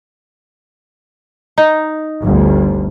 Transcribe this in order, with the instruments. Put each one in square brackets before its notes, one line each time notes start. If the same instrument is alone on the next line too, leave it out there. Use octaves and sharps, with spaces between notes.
[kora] D#4
[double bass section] G1 D2